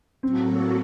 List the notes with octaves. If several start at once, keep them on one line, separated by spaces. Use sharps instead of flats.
A2 F#3 A#3 C4 F#4 A4